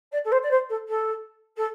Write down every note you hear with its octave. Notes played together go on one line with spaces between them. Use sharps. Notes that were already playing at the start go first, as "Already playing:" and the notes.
D5
A4
C5
D5
C5
A4
A4
A4